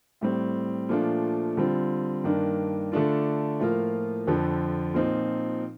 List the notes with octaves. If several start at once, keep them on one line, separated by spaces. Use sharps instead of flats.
A2 G3 C4
A#2 F3 A3 D4 F4
D3 G3 C4 F4
G2 D#3 A#3 D4
D3 A3 D4 F4
A2 F3 A#3 F4
F2 D3 F3
A#2 F3 C4 D#4